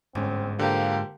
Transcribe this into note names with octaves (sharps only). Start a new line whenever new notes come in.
G1 G#2 C4 C#4
D3 F3 A#3 G4